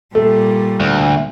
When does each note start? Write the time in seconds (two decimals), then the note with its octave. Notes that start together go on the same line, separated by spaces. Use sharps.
0.15 A#2 G3 A3
0.80 D2